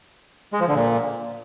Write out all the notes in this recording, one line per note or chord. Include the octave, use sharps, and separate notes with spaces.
G#3
F3
D3
A#2